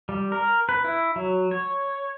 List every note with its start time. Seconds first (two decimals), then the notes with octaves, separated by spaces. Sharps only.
0.09 G3
0.32 A#4
0.69 B4
0.84 E4
1.16 F#3
1.51 C#5